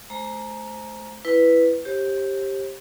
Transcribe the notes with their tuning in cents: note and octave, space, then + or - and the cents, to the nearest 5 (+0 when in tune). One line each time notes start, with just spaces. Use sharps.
A3 -35 C5 +0 A#5 +10
E4 +10 B4 +0
G4 +0 C5 +40